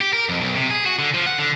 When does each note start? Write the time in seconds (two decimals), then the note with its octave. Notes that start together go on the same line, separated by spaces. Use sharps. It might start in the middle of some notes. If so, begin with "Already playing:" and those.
0.01 G4
0.13 A#4
0.29 F2
0.41 B1
0.56 C3
0.70 G#4
0.86 F#4
0.99 D3
1.14 F3
1.26 F#5
1.38 D3